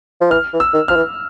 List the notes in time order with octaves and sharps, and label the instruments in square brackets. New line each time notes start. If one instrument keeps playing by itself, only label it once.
[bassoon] F3
[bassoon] E3 [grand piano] F6
[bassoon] E3
[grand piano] E6
[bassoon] D#3
[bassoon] F3 [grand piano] F6
[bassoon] E3